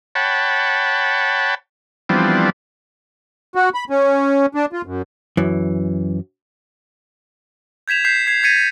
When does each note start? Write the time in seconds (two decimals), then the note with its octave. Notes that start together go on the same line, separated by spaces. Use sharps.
0.15 C#5 F#5 G5 A5 B5
2.09 E3 F3 G3 B3 C4 D4
3.55 F#4
3.74 B5
3.90 C#4
4.55 D4
4.73 F4
4.86 F#2
5.37 F#2 E3
7.88 G6 G#6 B6 E7 F7
8.05 G6 B6 C7
8.27 G#6 C7
8.43 G#6 A6 B6 C#7 D#7